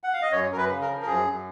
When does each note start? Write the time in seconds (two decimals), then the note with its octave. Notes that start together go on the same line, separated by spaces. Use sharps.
0.04 F#5
0.13 F5
0.22 D#5
0.32 F#2 C#5
0.50 F#2 A#4
0.57 B4
0.70 C#3
0.82 A#4
0.89 F3
1.02 A#4
1.06 F#2 G#4
1.26 F#2